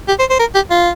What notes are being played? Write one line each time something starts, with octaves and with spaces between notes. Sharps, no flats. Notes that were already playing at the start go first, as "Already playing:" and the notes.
G4
C5
C5
A#4
G4
F4